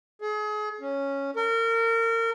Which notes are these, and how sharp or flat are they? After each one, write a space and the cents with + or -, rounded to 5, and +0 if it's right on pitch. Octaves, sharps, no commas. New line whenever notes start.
G#4 +35
C#4 +0
A#4 -30